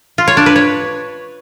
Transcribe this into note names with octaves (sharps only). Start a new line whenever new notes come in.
F4
C#5
D4
B4
C#5